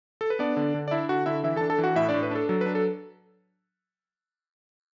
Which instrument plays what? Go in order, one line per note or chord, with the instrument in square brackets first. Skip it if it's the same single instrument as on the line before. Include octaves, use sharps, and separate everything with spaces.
[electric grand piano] A4
B4
B3 D4 D5
D3
D3
D5
D4 E4 E5
D3 F#4 F#5
D3 E4 E5
E3 E4 E5
D4 A4 A5
A4 A5
E3
F#4 F#5
A2 E4 E5
D4 D5
A2
B4
D4 A4
F#3 A4
B4
D4
A4